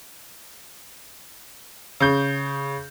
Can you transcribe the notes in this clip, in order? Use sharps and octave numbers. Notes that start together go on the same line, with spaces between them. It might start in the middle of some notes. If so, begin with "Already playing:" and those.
C#3 G6